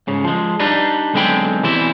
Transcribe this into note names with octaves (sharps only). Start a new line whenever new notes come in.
G#2 C#3
F3 G#3
G3 D4 D#4 B4
B1 D3 G#3 C4 G5 B5
B2 E3 G3 C4 E4